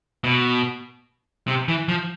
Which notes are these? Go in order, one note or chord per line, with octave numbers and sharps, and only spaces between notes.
B2
C3
E3
F3